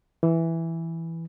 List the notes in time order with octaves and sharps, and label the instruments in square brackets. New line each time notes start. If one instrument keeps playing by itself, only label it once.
[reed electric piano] E3